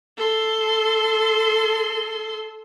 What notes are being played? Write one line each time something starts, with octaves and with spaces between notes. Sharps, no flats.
A4 C6